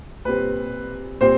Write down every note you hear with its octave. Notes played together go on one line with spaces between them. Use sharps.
A#2 G3 C4 B4
A#2 G3 C4 C5